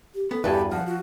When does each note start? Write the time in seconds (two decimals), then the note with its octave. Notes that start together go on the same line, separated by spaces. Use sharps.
0.15 G4
0.31 B3 A4
0.44 E2 G2 F#4 G4 A4 B4 G#5
0.71 F3 F#5
0.86 F4 F#4